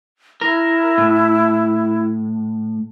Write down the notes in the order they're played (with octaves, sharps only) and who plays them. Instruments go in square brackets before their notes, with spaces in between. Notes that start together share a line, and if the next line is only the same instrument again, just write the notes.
[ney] E4 [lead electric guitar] A#4
[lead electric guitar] A2